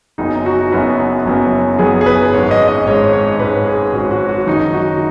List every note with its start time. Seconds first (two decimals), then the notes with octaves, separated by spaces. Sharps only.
0.18 F#1 F#2 F#3 B3 D#4
0.46 F#4
0.72 F#1 F#2 F#3 B3
1.25 F#1 F#2 F#3 B3
1.79 F#1 F#2 F#3 B3 G#4
2.01 G#4
2.06 B4
2.33 G#1 G#2 G#3 C#4 C#5
2.51 D#5
2.68 D#5
2.86 G#1 G#2 G#3 C#4 C#5
3.13 C#5
3.39 G#1 G#2 G#3 C#4 B4
3.67 G#4
3.93 G#1 G#2 G#3 C#4 F#4
4.11 F#4
4.29 F#4
4.46 F#1 F#2 D#3 D#4
4.74 F#4